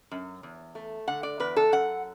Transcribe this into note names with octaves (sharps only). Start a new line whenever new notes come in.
F#2
E2
A3
D3 F#5
D5
E2 B4
A4
F#2 F#5